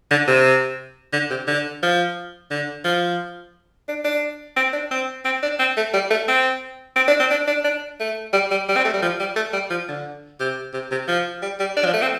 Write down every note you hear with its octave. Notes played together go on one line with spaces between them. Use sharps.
D3
C3
D3
C3
D3
F3
D3
F3
D4
D4
C4
D4
C4
C4
D4
C4
A3
G3
A3
C4
C4
D4
C4
D4
D4
D4
A3
G3
G3
G3
C4
A3
G3
F3
G3
A3
G3
F3
D3
C3
C3
C3
F3
G3
G3
D4
F3
A3
C4